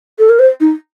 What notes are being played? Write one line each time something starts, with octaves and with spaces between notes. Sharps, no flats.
A4
A#4
C5
D#4